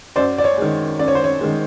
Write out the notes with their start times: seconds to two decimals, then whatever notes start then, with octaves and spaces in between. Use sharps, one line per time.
0.16 F#2 C5 D5
0.38 D5
0.44 C#5
0.58 D#3 G#3
0.99 F#2 D5
1.08 C#5
1.15 C5
1.24 C#5
1.41 D#3 G#3